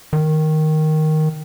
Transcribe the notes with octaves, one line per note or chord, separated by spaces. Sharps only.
D#3